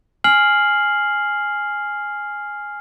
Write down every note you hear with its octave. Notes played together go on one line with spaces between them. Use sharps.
G#5 F6 C7 F#7